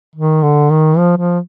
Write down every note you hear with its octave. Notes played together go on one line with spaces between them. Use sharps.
D#3
D3
D#3
F3
F3